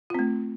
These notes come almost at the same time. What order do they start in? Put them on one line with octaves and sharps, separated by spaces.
F4 C4 A3